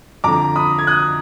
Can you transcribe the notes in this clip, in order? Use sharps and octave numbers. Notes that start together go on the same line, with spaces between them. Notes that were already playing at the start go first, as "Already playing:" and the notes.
F2 D3 F3 A#5 D6
B5 D#6
G#6
D#6 F#6